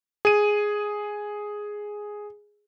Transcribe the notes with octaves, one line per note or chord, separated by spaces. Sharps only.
G#4 D#7